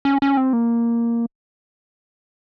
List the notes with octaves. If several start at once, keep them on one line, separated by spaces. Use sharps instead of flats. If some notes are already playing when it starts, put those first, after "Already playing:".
C#4
C#4
C4
A#3